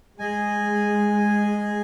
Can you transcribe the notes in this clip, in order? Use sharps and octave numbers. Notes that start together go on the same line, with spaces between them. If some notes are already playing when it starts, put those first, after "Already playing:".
G#3 G#4 D#5 G#5